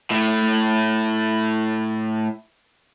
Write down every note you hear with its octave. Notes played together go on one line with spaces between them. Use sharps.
A2 A3